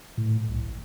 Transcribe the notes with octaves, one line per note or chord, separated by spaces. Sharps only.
A2
B1
G#1